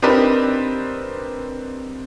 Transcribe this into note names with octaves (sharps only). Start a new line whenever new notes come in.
C4 D4 D#4 G4 A#4 B4